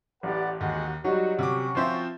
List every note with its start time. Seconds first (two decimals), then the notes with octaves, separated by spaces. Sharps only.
0.23 A1 G4 B4 D5 F#5
0.61 D#2 G#3 F#4 F#5
1.04 F#3 G3 D#4 F#4
1.39 C3 C#4 F#4 C#6 D6
1.75 F3 C4 F4 C5 E5